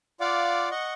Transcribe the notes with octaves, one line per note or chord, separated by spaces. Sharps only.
F4 D5 F5 F#5 D6
D#5 F#5 C#6